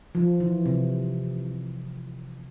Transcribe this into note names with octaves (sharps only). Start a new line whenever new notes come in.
F3
E3
C3